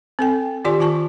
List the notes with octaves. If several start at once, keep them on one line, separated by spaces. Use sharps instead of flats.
C4 A4 G5
D#3 F4 G4 D5 G#5 C6
D#3 F4 G#5 A5 C#6